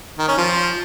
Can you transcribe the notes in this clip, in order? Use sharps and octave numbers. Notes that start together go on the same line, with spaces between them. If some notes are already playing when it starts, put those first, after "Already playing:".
D#3
C#4
F3